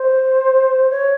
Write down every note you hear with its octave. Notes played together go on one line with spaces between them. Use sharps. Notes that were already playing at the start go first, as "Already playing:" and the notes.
Already playing: C5
C#5